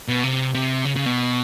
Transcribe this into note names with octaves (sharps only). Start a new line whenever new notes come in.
B2
C3
C3
C#3
C#3
B2